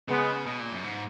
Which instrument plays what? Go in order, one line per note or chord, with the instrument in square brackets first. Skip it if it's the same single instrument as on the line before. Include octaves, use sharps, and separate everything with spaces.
[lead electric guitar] C#3 [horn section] G#3 B3
[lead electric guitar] B2
A#2
F#2
G#2